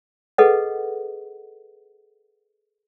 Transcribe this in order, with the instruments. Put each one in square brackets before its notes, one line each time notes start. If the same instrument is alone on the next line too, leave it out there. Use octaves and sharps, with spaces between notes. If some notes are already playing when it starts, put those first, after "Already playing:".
[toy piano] G#4 A4 B4 D#5 F#5